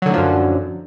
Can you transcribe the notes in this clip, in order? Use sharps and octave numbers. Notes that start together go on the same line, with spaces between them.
F#2 A2 D3 F3 F#3